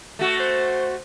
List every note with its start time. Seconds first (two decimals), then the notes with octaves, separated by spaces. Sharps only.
0.19 A3 F#4
0.39 C5